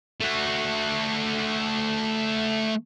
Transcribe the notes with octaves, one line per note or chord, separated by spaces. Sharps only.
A3 F#4